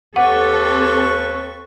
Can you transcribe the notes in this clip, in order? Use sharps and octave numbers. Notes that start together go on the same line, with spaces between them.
D#2 C4 G4 A4 B4 F#5 C#6